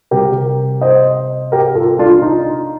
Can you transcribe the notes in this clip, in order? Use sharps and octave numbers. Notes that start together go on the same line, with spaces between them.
C3 G3 G4 A#4
C5 D#5
G4 A#4
F4 A4
D4 F4
D#4